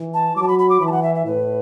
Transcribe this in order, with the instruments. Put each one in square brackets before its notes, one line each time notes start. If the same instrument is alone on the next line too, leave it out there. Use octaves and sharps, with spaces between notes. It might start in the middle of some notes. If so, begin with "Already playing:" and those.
Already playing: [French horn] E3
[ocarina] A5
[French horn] F#3 [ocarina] D6
[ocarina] A5
B5
B5
D6
[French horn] E3 [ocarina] B5
[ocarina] A5
F#5
E5
E5
[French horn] A2 [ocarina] B4